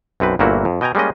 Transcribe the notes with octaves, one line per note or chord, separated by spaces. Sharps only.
B1 F#2 C4 B4
G1 A#2 A3 A#3 E4 F#4
F2
B2 D#5 G5 G#5 A#5
G3 G#3 A#3 C#4 D#5